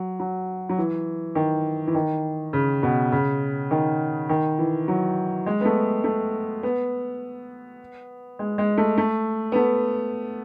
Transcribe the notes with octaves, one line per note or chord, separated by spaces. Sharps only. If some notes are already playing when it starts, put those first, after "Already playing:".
Already playing: F#3
F#3
F#3
E3
D#3
E3
D#3
C#3
B2
C#3
D#3
D#3
E3
F#3
G#3
B3
A3
A3
B3
G#3
G#3
A3
A3
B3
A3